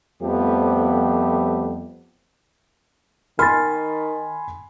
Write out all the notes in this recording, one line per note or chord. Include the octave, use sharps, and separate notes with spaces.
F2 F3 G3 A3 B3 G4
D#3 G#5 B5 C6 F6 A6